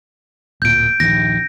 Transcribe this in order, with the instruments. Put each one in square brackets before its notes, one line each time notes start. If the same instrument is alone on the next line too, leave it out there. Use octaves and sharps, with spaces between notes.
[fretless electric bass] D1 A#2 [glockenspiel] G6 D7
[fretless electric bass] A#1 D#2 [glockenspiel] A#6